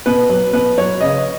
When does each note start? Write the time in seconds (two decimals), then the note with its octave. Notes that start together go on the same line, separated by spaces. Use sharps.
0.06 B2 B4
0.29 F#3
0.53 B2 B4
0.78 F#3 C#5
1.01 C#3 D#5